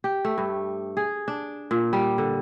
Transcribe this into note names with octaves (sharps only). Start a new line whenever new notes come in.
G4
A3
G2
G#4
D4
A#2
G3
D3